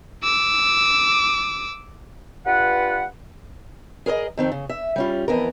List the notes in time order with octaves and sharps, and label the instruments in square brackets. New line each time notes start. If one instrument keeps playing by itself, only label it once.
[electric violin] D6 E6
[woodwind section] G2 F4 B4 F#5
[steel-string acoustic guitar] G#4 A#4 C5 D#5
F2 D#3 C4
C#3
E5
G3 C#4 F4
F2 E3 B3 A#4